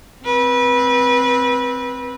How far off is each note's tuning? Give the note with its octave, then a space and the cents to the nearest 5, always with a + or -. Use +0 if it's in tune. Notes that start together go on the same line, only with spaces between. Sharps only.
C4 +0 B4 -25